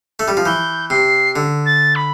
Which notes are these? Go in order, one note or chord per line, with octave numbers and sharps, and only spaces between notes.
A3
G3
F3
E3 G6
C3 C7
D3
A6
B5